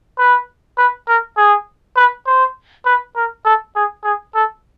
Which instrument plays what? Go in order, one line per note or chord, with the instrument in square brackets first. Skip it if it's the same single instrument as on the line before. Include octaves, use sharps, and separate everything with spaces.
[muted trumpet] B4
B4
A#4
G#4
B4
C5
B4
A#4
A4
G#4
G#4
A4